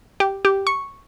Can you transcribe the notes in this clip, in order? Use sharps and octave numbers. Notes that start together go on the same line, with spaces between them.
G4
G4
C#6